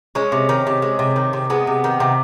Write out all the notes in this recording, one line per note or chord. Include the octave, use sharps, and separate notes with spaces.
G#3 C#4
C3
D#3
C3
G#3
C3
D#3
C3
G#3 B3
C3
D#3
C3